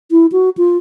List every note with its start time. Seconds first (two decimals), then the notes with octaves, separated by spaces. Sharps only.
0.11 E4
0.32 F#4
0.57 F4